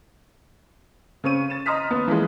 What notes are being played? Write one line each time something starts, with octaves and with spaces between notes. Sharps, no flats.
C#3 C4 C#6 D#7
A6 E7
D#5 A#5 C6 D#6 F6 B6
D#2 B3
E3 F3 G#3